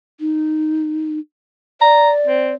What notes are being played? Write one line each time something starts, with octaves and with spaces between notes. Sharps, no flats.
D#4
D5 A#5
C4